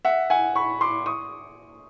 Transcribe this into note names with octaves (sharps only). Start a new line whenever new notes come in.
E5 F#5
F#5 G#5
B5 C#6
C6 D6
C#6 D#6